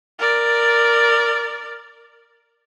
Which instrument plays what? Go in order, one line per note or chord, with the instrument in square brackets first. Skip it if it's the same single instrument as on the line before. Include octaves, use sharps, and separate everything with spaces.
[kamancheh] A#4 D5